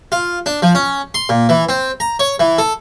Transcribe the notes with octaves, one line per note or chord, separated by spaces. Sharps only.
F4
D4
F3
C#4
C6
A#2
E3
C4
A#5
C#5
E3
A4